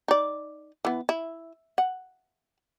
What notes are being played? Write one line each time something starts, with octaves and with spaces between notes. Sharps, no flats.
D#4 D5
E3 B3
E4
F#5